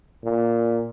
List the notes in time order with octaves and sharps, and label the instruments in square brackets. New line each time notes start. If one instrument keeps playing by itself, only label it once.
[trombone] A#2